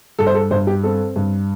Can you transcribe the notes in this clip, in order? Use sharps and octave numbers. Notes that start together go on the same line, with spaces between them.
G2 A4
C5
A4
G2 C5
G4
C4 A4
G2